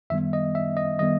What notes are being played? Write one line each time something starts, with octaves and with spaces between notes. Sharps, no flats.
F#2 D#3 G3 B3 E5
D#5
E5
D#5
D#3 G3 B3 D#5